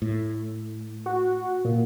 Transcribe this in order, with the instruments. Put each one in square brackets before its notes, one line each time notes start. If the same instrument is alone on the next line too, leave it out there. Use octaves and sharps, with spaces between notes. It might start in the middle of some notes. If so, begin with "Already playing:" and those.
[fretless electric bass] A2
[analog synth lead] F#4
A#2